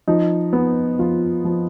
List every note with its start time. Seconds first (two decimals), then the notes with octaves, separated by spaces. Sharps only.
0.08 F3 D#4
0.53 B3
0.99 F3 F4
1.45 F3